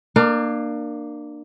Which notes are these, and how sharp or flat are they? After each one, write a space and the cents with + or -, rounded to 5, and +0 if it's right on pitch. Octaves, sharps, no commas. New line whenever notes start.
A#3 +0 D4 +30